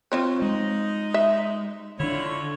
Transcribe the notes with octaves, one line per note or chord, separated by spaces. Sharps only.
F3 C4 C#5
G#3 D#4
E5
D3 D4 E4 F4 C#5